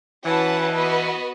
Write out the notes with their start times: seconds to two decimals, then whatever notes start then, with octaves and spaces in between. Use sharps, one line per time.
0.25 E3 C#4 F#4 B4 F#5 A5
0.75 B3 F#4 B4 D#5